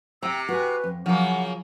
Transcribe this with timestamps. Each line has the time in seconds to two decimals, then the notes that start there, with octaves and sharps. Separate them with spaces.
0.23 C3 G5 A#5 E6
0.49 F#4 B4 G#5
0.84 F2
1.06 C#3 F3 F#3 A#3 F#5